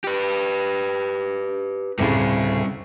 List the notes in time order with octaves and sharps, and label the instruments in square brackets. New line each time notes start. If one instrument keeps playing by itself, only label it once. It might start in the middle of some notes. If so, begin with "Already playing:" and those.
[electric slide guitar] G4 B4
[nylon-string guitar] D2 A2 C#3 [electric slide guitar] G3 C4